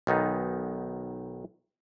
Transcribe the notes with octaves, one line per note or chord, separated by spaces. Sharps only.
B1 D#3 B3 D#4